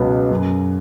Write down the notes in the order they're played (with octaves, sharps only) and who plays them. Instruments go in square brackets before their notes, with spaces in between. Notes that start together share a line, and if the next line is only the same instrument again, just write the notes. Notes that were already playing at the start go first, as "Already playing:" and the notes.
Already playing: [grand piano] C#2 B2 F#3 B3
F#2